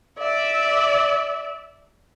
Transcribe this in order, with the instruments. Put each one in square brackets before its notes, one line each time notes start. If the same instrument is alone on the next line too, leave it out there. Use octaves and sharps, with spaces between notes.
[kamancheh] D5 E5